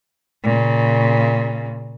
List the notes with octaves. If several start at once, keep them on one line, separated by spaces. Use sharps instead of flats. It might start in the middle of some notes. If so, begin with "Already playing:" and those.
A#2 C#3